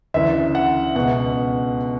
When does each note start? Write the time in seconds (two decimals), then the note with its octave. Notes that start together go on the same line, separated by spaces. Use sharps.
0.14 D2 C#3 E3 E5
0.55 F#5
0.95 C#2 B2 F#5